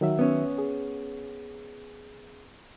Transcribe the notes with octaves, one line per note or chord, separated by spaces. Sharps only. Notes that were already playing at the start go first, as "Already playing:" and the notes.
D#3 F#3 E5
B3 C#4
G#4